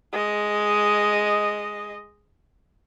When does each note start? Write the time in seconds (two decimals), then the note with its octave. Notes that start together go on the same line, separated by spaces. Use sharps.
0.12 G#3 D#5